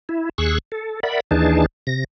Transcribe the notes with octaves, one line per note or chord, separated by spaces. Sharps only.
E4
D#2 G#4 C#6 E6 F#6
A4
A#4 D5 E5 F#5 B5
D#2 E3 D4 D#4 G#4 A5
C3 A#6